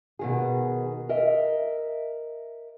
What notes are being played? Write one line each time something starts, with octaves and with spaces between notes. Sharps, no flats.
B2 D#3 G#4
A#4 D#5 E5